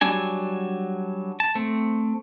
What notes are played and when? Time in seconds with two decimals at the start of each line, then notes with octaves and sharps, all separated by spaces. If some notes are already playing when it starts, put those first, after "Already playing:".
0.01 F#3 G3 D4 G#5
1.40 A5
1.55 A3 C4